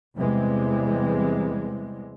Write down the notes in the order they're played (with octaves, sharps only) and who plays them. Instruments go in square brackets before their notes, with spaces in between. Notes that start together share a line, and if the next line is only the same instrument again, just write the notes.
[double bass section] E2 C3 E3 G3 G#3